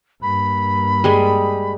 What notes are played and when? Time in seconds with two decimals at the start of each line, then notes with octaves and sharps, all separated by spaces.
0.22 G2 A#3 B5
1.04 G3 G#3 G#4